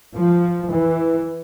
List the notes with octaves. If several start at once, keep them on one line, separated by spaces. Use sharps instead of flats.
F3
E3